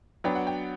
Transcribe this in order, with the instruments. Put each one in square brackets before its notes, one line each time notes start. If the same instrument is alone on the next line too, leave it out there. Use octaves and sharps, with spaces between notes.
[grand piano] F#3 B3 D4 G5
F#5
G5